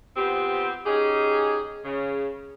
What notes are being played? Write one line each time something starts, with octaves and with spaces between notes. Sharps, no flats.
F3 B3 C4 G4
C#4 D#4 G4 G#4
C#3